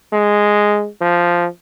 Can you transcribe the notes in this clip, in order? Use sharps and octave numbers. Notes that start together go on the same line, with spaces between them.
G#3
F3